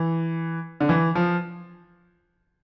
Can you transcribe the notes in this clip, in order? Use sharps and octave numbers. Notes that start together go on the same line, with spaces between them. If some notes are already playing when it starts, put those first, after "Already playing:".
Already playing: E3
D3
E3
F3